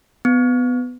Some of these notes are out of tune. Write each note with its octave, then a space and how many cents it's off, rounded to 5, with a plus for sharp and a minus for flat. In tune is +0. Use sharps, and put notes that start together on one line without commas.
B3 +15